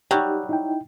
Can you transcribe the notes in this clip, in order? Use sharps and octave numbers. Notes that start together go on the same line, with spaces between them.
F#3 G3 D#4 G4
D#4 E4 G5